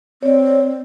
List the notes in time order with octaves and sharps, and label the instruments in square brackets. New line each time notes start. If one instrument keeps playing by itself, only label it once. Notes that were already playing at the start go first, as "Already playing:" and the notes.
[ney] C4 [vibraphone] C#5 D5